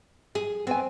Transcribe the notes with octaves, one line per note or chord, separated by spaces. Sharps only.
G#4
B3 C4 G#5